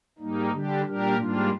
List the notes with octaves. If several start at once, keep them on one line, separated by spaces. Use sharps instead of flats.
G#2 G3 A#3 D#4
D3 G3 D4 G4
A#2 G3 D4 G4 A#4
G#2 G3 A#3 D4 F4